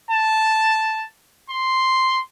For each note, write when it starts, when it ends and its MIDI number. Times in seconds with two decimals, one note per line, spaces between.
0.11 1.06 81
1.50 2.20 84